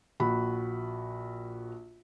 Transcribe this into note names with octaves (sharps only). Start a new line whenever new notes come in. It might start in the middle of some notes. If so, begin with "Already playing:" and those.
A#1 F#4 B5